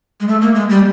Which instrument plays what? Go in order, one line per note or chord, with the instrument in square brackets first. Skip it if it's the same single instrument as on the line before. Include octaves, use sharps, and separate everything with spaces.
[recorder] G#3
A3
A#3
G#3
G3